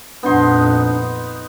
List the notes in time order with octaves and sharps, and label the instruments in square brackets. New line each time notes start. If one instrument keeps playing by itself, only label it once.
[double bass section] F2 A#2 [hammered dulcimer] B3 D#4 C6 [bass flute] D4